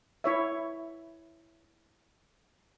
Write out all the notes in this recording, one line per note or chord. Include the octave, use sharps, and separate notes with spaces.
E4 C#5 E5